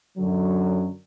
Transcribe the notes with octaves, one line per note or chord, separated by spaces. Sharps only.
F#2 D3 F#3